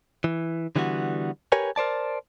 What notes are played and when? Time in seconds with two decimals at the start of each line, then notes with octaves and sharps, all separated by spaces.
0.24 E3
0.76 D3 E3 G3 B3 F#4
1.52 G4 A#4 B4 C#5 G#5
1.76 A#4 C5 D5 A5